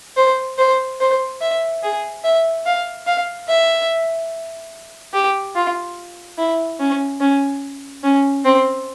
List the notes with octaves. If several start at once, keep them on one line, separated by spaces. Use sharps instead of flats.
C5
C5
C5
E5
G#4
E5
F5
F5
E5
G4
F4
E4
C#4
C#4
C#4
C4